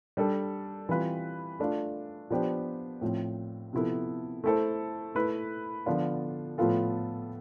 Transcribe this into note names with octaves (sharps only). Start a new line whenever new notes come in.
G3 D4 A4
E3 G3 C4 F4 B4
A3 D4 F4
F3 B3 D4 G4 C5
A2 F3 C4
C3 F3 B3 E4 A4
A3 E4 A4 C5
A3 E4 B4
D3 F3 B3 D4 F4
A2 F3 B3 F4 A4